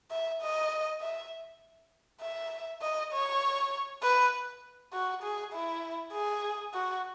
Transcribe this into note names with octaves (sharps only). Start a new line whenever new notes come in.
E5
D#5
E5
E5
D#5
C#5
B4
F#4
G#4
E4
G#4
F#4